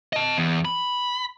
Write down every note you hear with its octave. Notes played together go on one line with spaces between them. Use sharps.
D#5 A5
E2
B5